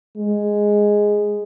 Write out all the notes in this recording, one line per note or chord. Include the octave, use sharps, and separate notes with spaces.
G#3